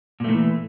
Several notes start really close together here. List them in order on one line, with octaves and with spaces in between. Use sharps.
A#2 A3 D#3 E3